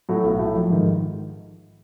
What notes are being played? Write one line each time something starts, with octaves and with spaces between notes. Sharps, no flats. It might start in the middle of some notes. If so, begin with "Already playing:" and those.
A2 F#3 A3
B1
A2 F#3 A3
A#1
G#2 D#3